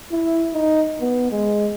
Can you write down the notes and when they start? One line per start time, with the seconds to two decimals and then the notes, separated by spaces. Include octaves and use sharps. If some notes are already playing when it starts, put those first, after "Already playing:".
0.12 E4
0.53 D#4
1.01 B3
1.32 G#3